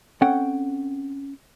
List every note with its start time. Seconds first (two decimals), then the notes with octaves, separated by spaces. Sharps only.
0.21 C4 C#4 A4 F#5 G5